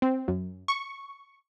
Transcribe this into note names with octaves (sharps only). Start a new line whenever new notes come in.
C4
F#2
C#6